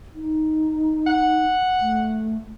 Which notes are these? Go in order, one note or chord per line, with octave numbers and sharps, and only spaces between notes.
D#4
F#5
A3